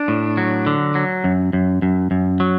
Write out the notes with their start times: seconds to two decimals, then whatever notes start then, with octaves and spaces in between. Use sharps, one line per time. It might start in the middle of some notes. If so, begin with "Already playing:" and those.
Already playing: D4
0.08 A2
0.37 F#3
0.66 D3
0.95 F#3
1.24 F#2
1.53 F#2
1.82 F#2
2.11 F#2
2.40 F#3